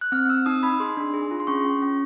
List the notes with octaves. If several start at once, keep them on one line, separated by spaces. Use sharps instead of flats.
F#6
C4 F6
C4 E6
D#4 D#6
D#4 B5
G#4 C6
D4
G#4
F4
C6
C#4 C#6
C#4
C#4